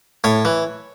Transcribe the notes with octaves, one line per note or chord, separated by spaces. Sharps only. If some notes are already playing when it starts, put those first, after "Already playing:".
A2 C#5
E3